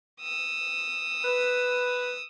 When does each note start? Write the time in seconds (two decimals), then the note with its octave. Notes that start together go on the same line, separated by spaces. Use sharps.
0.20 D#6 E6
1.25 B4